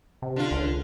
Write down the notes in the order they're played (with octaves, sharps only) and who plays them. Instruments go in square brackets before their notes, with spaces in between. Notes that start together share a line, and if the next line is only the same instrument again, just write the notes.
[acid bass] C3
[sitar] D3 F4
[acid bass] C#2